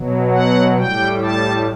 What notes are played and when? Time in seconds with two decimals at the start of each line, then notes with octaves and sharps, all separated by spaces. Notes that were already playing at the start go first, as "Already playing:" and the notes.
Already playing: B2 F#3
0.32 F#5
0.77 A2 G3 G5
1.22 A5